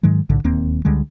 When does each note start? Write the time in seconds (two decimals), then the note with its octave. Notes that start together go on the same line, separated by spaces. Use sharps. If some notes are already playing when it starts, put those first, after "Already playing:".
0.03 G#2 D#3 F#3 G#3
0.29 B1 A2 D3
0.44 D1 D#2 A#3 C4
0.85 C#2 D3 G3 G#3